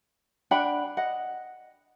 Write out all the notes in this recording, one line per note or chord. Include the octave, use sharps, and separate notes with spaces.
D4 F#5 G5 B5
D#5 F#5